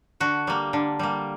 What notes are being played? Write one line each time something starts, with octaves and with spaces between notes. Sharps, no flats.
D3 F#4
G3 A#3
D3
G3 A#3